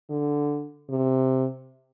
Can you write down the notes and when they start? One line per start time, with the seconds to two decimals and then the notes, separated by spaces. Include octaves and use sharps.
0.10 D3
0.90 C3